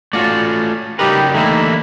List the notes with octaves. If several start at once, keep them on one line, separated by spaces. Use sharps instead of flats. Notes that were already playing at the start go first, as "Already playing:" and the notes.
A3 C#4 F4 F#4 D5
C#3 F#3 G3 D#4 G4 A#4 B4
D3 E3 A3 A#3 D#4 E4